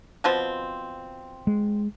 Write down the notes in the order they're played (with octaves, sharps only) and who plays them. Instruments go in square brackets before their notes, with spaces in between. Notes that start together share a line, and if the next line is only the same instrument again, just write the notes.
[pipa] B2 F3 C4
[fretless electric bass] G#3